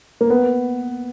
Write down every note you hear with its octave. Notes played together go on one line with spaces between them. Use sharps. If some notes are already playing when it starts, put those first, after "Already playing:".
A#3
B3